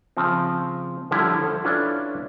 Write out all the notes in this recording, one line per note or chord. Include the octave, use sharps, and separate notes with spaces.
C#3 F3 C4
D3 F3 G3 C#4 E4
A4 C5
C#4 D4 E4 F4 A4 B4